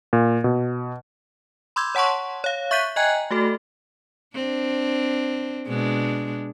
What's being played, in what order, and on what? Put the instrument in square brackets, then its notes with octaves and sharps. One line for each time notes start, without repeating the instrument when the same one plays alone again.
[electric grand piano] A#2
B2
[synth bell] B5 C6 D6 E6 G6 G#6
C#5 F#5 A5 C6 C#6
C#5 F5
E5 C#6 F#6 G6 B6 D#7
D#5 G5 G#5 A#5 F#6 G#6
A3 F#4 A4
[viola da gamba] C4 D4
B2 G#3 D4